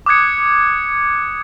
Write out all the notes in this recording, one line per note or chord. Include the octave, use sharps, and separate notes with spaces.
D6 D#6 F#6 G#6 C#7